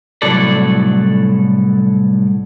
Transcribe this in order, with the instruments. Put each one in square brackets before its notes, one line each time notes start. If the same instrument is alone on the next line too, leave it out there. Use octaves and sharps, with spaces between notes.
[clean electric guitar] C2 A2 F#3 A4 D5